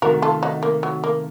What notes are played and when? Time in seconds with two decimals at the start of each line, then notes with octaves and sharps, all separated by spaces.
0.02 C3 D#3 A3 F#4 A#4
0.22 F4 A4
0.43 D#4 F#4
0.63 A#3
0.83 F#3
1.04 A#3